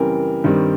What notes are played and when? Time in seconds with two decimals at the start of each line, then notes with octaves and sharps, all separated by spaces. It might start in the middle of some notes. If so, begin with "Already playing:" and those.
Already playing: F#2 C#3 E3 G3 C4 A#4
0.44 G2 D#3 G3 C4